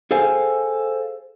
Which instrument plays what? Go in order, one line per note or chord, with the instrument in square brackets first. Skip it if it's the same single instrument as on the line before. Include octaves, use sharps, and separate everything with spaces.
[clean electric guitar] G#4 A4 C5 F5 G5 G#5